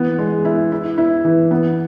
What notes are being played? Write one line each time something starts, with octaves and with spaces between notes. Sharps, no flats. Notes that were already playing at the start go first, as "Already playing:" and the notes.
Already playing: E3 B3
G#3
E4
E4
E4
E3
B3